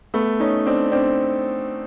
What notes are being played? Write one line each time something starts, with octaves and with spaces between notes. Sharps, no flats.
A3 B3
C#4 D#4
C4 D4
C4 D4